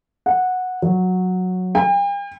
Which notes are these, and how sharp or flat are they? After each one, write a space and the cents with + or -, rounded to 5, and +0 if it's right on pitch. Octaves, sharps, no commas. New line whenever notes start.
F#5 -10
F#3 -10
G5 +45